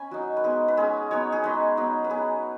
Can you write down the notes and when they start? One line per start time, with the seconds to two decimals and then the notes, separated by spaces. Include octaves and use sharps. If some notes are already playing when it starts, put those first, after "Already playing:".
Already playing: C#4 G#5 B5
0.11 F#3 D#4 F#4
0.37 B4
0.44 G#3 B3 D#4 G#4
0.68 B4
0.77 G#3 C#4 G#4
1.11 F#3 B3 D#4 C#5
1.32 G#4
1.44 G#3 D#4 B4
1.77 F#3 B3 D#4
2.04 B4
2.10 F#3 B3 D#4 G#4